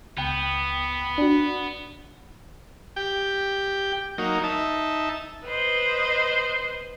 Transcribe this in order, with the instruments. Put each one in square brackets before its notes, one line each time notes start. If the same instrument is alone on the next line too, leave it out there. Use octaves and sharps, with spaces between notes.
[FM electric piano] C#2 G5 [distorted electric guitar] B3
[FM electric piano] D4 F#4
[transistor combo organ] G4 G5
F#3 A#3 D#4
D#4 E5 A5
[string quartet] B4 C5 D#5